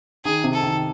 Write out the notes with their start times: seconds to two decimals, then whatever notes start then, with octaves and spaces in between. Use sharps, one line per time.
0.25 D#3 G#4
0.44 C3
0.53 A4
0.63 D#3